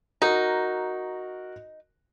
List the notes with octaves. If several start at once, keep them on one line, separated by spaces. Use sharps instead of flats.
D#4 F#4 A#4